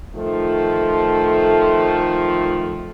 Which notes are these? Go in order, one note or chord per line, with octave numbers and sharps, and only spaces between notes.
D#3 F3 A3